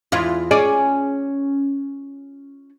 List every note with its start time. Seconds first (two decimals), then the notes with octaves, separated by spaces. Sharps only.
0.12 E2 E4 F4
0.51 C#4 G#4 D5